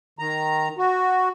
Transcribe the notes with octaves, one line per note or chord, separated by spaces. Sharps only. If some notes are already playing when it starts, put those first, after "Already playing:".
D#3 A#5
F#4